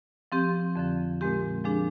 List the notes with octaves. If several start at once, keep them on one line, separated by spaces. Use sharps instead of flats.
F3 C4 G4
F2 D3 F3
A#2 G#3 C4 G4
F3 G#3 D4 G#4